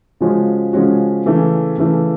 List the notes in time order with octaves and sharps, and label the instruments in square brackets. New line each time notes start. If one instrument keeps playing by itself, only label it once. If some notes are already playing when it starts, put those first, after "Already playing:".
[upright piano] C#3 F3 G#3 C#4 F#4
C#3 F3 G#3 C#4 F#4
C#3 E3 A3
C#3 E3 A3